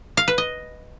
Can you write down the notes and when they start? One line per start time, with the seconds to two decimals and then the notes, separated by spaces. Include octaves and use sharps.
0.17 F5
0.28 B4
0.38 D#5